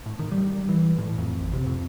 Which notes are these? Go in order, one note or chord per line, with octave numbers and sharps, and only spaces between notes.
A2
D#3
G3
E3
A2
F2
A1
C3
F2